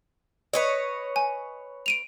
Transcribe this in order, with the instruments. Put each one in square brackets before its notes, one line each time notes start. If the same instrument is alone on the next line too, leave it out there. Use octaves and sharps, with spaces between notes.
[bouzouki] B4 C#5 D#5
[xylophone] G#5
D7 D#7 F7